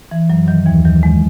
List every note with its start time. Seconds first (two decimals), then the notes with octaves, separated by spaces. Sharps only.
0.11 E3
0.30 F#2 F#3
0.48 D#3 F#3
0.66 D#2 E3
0.85 D#3 F#3
1.03 E2 G#3